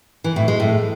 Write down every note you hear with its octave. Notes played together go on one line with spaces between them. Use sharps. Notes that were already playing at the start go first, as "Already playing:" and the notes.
E3
A2
G#3
A2